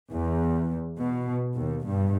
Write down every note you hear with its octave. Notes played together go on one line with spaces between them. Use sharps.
E2
B2
D#2
G2